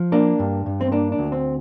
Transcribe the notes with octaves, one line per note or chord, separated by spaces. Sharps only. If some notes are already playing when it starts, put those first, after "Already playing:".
Already playing: F3
A#3 D4
G2
G2
C4
A#3 D4
D4
D2
C4